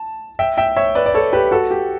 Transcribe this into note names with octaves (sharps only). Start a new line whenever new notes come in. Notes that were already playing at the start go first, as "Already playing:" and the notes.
Already playing: A5
E5 G5
E5 G5
C#5 E5
B4 D5
D5
A4 C#5
G4 B4
F#4 A4
G4